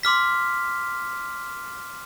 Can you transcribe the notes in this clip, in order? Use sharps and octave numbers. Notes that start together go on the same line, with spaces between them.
C6 D6 F6 B6